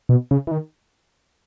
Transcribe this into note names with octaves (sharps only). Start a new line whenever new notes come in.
B2
C#3
E3
D#3